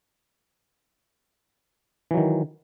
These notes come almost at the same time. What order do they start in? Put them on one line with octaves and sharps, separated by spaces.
E3 F#3 D#3